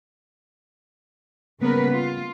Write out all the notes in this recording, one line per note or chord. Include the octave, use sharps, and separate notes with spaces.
C#3 G3 A#3 B3 A#4 B4
F4